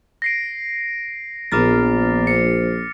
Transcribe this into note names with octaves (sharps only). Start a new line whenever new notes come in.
A#6 C7 D7
A#1 B3 F4 A#5 D6 F6 A6
C5 C#7